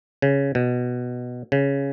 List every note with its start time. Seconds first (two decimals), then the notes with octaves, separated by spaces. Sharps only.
0.22 C#3
0.55 B2
1.52 C#3